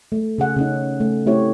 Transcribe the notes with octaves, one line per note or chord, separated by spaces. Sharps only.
A3
C#3 G#4 F#5
C#3 C#4 D#4
A3
A3 C4 E4 G4 C#5